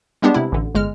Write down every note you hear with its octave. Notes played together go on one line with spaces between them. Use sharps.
G3 G#3 B3 D4 G4
C3 E4
A1 D3
G1 G#3 F6